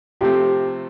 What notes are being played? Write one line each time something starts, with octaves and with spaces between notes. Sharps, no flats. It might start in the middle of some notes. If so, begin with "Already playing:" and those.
C3 F3 A3 C4 G4